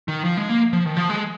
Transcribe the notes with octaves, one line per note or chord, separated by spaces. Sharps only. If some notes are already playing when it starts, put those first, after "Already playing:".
D#3
F3
G#3
A#3
F3
D#3
F3
G#3